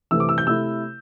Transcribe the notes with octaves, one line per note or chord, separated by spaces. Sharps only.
C3 E3 A3 E6
D6
E6
G6
C3 A3 E4 E6